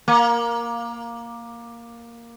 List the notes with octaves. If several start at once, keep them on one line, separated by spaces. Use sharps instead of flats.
A#3